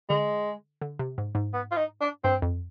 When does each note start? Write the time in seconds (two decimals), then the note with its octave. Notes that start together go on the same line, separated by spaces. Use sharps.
0.09 D3 G#3
0.81 D3
0.99 C3
1.18 G#2
1.35 G#2
1.54 B3
1.72 F4
1.77 D#4
2.01 D4
2.24 G2 C4
2.42 F2